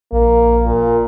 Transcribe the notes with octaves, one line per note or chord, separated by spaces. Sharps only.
A#1 A#3
A#2